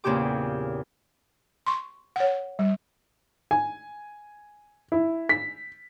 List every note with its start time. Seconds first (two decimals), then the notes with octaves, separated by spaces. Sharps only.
0.04 E2 A#2 C#3 C4 G4 D6
1.66 C6 C#6
2.16 C#5 F#5
2.59 G3
3.51 G#5
4.92 E4
5.29 B6